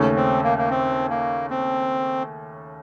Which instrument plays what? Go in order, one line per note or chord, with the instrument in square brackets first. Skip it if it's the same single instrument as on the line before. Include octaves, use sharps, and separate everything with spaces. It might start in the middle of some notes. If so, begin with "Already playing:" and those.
Already playing: [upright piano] D#2 C#3 A3 C#4
[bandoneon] C4
A#3
A#3
C4
A#3
C4